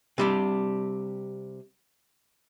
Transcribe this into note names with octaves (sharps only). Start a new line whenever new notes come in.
C3 G3 D4